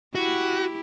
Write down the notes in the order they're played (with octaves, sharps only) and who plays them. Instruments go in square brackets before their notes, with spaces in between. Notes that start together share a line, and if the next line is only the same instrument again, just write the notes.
[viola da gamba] E4 G4 [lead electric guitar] F#4